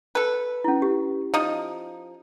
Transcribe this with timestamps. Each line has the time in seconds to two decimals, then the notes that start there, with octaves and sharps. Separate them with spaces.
0.15 A4 B4
0.64 C#4 E4
0.82 G4
1.34 F3 D#4